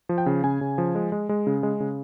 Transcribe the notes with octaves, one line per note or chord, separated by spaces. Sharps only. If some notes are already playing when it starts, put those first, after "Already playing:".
F3
G5
C#3
C#3 G#5
C#3
F3
G#3
G#3
G#3
C#3
G#3
C#3